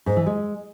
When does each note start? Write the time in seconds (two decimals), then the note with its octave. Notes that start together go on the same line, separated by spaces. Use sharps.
0.06 G#2
0.16 E3
0.26 G#3